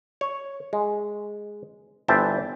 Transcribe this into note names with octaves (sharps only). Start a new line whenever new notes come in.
C#5
G#3
G1 E3 C5 E5 G5 A5